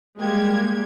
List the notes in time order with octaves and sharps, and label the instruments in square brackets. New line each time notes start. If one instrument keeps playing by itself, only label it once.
[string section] G3 G#3 A#3 G4 G#6